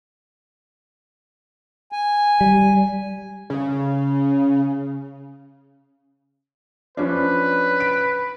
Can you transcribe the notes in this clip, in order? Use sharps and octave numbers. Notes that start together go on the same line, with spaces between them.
G#5
G3
C#3
F3 C#4 D4 B4
D7